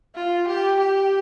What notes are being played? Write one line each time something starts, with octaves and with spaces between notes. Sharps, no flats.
F4
G4
G4